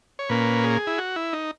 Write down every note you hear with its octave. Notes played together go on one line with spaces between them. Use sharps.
C#5
A#2 A#3 C#4 B4
G#4
E4
F#4
E4
D#4